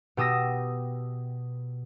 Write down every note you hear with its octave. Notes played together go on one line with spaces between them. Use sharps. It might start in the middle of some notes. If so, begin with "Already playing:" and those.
B2 G4 D#6 E6 A#6